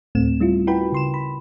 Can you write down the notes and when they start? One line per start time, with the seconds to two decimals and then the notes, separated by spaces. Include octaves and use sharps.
0.15 D2 A2 A3 C4 E7
0.40 G3 C#4 E4 F4
0.67 E4 F#4 A#4 B4 G5 B5
0.92 C#3 C6 E7
1.14 B5